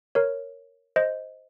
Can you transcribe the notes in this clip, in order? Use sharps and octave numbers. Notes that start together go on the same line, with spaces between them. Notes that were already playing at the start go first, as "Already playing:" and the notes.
A#4 C#5
C5 D#5